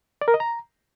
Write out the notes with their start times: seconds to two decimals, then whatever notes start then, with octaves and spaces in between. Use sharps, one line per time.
0.21 D5
0.28 A#4
0.34 D#5
0.40 A#5